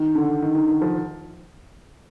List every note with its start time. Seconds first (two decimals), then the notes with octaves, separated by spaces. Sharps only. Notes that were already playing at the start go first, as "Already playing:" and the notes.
Already playing: D#3
0.15 D3
0.42 D#3
0.55 D#3
0.68 D#3
0.82 F3